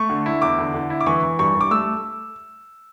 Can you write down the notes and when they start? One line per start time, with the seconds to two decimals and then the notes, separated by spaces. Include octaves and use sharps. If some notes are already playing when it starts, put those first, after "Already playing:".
Already playing: A3 C#6
0.10 D3
0.26 E4
0.42 E2 D6
0.58 D3
0.74 D3
0.90 E4
1.01 D6
1.06 E3 C#6
1.23 E3
1.39 G2 C#6
1.55 G2
1.61 D6
1.71 A3 E6